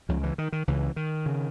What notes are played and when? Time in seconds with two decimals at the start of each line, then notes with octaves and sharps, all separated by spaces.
0.09 C#2 C#3 F3
0.23 E3
0.38 D#3
0.52 D#3
0.67 C#2 C#3 E3
0.96 D#3
1.26 C#3